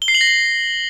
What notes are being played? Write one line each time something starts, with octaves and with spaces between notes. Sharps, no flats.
G7
C7
F#7
A#6
C7